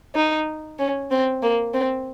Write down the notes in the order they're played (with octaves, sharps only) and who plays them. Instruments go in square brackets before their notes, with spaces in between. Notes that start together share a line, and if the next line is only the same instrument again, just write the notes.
[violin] D#4
C#4
C4
A#3
C4